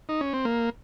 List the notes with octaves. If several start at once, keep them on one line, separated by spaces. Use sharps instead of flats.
D#4
C#4
C4
A#3